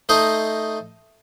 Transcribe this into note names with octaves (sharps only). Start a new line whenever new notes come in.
A3 D#4 C5 D#5